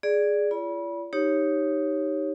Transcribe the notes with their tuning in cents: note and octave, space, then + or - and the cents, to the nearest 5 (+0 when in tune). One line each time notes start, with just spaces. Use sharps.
G#4 +0 D5 +0
F4 -45 D5 -40 B5 -30
D#4 +0 G4 +0 C#5 -10